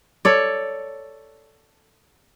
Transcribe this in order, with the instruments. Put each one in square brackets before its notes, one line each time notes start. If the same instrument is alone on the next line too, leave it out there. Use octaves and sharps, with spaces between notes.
[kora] A4 C#5 D5